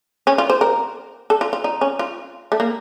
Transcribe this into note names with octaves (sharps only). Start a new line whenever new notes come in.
C#4
F4
C5
A#4
A4
F4
F4
D#4
C#4
F4
A3
A#3